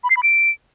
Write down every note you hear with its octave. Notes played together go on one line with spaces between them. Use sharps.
B5
C7
B5
D7